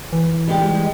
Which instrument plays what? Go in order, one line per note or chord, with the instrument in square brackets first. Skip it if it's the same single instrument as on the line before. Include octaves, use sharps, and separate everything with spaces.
[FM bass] E3
[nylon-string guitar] G3 G#3 G4